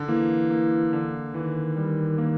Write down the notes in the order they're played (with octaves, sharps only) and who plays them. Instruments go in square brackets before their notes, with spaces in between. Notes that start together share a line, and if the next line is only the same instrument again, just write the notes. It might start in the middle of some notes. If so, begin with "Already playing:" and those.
Already playing: [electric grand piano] D3
[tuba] E3 [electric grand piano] A#3
[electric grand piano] A#3
D3
[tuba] D#3 [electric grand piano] E3
[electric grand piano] G3
A#3